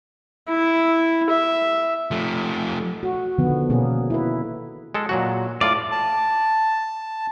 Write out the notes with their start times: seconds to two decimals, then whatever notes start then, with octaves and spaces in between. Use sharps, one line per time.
0.48 E4
1.30 E5
2.11 F3 A3
3.03 F#4
3.38 D3 D#3 F3 B3
3.70 B2 A#3 B3 C#4 G#4
4.10 E4 B4
4.94 G#3 A4
5.09 A#2 F#3 F#4
5.61 A2 F4 D5
5.92 A5